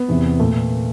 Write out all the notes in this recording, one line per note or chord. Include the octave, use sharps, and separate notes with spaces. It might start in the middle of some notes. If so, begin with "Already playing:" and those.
Already playing: B3
E2 C3 E3
A#2 A3